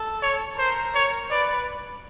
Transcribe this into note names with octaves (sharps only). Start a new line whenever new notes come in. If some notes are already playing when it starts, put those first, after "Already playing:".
Already playing: A4
C#5
A#4 C5
C#5
B4 D5